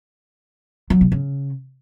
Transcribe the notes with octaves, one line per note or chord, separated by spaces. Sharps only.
F#3
B2
C#3